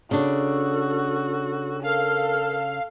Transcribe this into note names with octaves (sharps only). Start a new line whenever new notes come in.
C#3 D4 F#4 A4
A4 A#4 F5